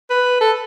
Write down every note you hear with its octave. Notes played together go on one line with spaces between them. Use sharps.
B4
A4